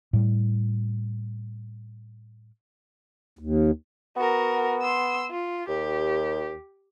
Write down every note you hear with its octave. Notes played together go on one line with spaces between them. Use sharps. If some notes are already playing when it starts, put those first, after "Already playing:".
A2 G3
D#2
B3 F#4 A#4
C6 E6
F4
D#2 G4